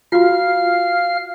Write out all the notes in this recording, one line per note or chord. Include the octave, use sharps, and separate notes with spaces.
F4 F#4 F5 F6